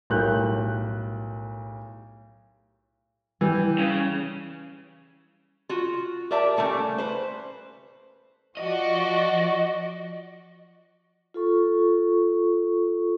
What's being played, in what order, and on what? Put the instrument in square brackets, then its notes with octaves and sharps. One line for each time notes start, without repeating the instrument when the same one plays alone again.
[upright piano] B1 A2 G3 A#4 F#6 G6
[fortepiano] E3 [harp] G3 G4
[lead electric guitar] C#3
[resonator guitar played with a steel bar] F4 F#4
G4 A#4 D5 E5 A5
C#3 E3 G3 A3 A#3
B4 C5
[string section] F3 F#4 D5 [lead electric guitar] D#5
[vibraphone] F4 A4 C#6